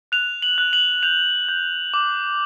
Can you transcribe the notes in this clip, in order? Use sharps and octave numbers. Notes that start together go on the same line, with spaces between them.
F#6 F7
F#7
F#6
F#7
G6 F7
G6
D6